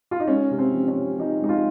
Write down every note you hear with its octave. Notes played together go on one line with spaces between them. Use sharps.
F4
D#4
G#3 C#4
C3
C4
F3
C#4
C3
F3 D#4
G#3 D#4
F4